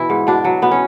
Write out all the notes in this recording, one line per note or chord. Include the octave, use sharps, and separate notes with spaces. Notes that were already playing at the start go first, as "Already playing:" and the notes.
Already playing: B2 E3 E4
G#2
B2 D4
F#3
B2 B3
C#4